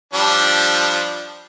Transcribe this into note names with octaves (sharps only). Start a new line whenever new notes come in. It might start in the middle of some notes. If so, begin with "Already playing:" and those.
F3 G3 D4